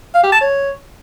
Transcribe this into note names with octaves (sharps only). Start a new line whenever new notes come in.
F5
G4
A5
C#5